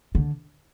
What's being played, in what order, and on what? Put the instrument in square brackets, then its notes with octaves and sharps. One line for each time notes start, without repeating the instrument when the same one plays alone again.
[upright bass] D3